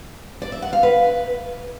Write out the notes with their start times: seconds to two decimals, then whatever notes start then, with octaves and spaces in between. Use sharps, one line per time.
0.42 D5
0.52 E5
0.62 F#5
0.73 F5
0.83 B4